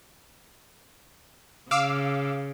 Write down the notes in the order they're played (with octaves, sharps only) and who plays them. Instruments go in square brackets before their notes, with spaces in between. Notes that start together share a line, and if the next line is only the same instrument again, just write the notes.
[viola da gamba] C#3 [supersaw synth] F5 D6 E6